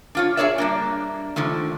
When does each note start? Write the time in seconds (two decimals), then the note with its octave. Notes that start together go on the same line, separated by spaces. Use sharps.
0.15 D4 F4 C#5
0.37 G#4 A#4 C#5 D5 E5
0.58 G3 A#3 D4
1.36 D3 D#3 F3 A3